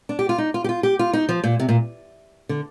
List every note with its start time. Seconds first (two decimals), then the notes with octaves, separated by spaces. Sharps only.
0.09 D4
0.19 G4
0.29 F4
0.38 D#4
0.54 F4
0.64 G4
0.69 F4
0.83 G4
0.99 F4
1.13 D#4
1.29 F3
1.44 A#2
1.60 C3
1.69 A#2
2.49 D3